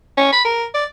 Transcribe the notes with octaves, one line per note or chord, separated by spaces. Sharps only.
C#4
B5
A#4
D5